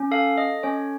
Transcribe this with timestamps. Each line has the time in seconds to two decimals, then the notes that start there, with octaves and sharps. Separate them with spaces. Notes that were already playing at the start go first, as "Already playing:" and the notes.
Already playing: C#4
0.11 A4 F5
0.38 A4 D#5
0.63 C#4 C#5